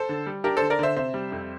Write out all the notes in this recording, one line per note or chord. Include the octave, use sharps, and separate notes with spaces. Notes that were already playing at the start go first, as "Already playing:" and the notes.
Already playing: A4 C5
D3
G3
D4 G4 A#4
A4 C5
D3
A#4 D5
D3 C5 E5
C3 C5 E5
G3
F2